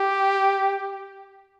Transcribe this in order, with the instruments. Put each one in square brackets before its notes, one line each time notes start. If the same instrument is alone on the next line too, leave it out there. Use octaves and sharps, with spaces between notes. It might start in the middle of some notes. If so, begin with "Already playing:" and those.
Already playing: [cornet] G4